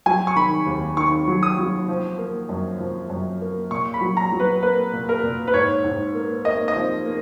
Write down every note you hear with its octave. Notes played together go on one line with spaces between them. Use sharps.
F#3 G#5
C#6
D#3 B5
D#2
D#3 C#6
F#3
D#6
F#3
F3
A#3
F#2
F3
F#2
A#3
A#2 C#6
B5
F#3
A#5
F#3
B4
A#3 B4
A#2
A#4
A#2
B4
G#2 C#5
G#2
A#3
A#3 D#5
D#5
F3
A#3